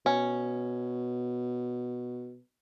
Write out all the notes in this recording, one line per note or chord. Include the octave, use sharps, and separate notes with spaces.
B2 C#4